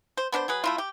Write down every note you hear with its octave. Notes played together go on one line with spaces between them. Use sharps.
C5
B3 D4 A#4 C5
F#3 G#4 B4
A3 E4 F4
G4